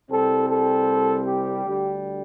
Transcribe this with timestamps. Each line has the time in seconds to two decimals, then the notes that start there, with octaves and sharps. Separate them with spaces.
0.10 C2 C3 G3 C4 A4
0.49 A4
1.26 G4
1.65 D2 D3 G3